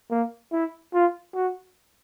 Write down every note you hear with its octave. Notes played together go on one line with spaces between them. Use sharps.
A#3
E4
F4
F#4